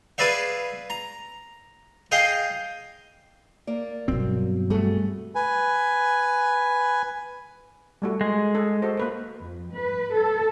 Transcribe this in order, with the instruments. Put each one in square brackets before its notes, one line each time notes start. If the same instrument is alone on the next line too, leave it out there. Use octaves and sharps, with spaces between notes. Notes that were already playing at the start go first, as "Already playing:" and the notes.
[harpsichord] G#4 B4 D5 E5 F5
A#5
G#4 D#5 F5 G5
[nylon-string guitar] A#3 D5
[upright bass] G2 B2 [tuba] F#3 [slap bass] C4
[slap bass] G3 A3 [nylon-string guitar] F#4 G#4 A4
[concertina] B4 G#5
[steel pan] G3 A3 F#4
[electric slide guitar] G#3
[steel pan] G#4 A4
F#4 A4 C5
A#3 B4 C5
[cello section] F2
B4
A4